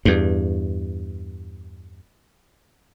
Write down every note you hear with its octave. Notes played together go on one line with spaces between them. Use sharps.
E2 G2